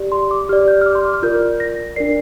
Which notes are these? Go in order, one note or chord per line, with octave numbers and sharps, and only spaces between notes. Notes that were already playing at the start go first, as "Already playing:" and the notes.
Already playing: G4 D5
C6
D6
G4 D5 F6
G6
F6
D6
C6
D6
F6
F4 A#4 D5 G6
A#6
D4 A#4 D5 C7